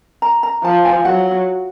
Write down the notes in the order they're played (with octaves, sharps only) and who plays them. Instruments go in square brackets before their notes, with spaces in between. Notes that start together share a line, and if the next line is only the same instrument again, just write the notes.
[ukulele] A#5
A#5
[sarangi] F3 [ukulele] A5
[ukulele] G#5
[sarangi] F#3 [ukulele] F#5